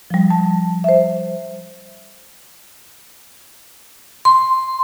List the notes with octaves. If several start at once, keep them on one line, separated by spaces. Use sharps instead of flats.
F3 G3
A5
C5 E5
C6